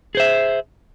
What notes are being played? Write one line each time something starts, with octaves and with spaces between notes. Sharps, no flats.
G#4 C5 E5